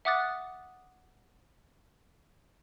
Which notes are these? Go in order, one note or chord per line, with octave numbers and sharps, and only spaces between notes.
E5 F#5 D6 D#6 F#6 A6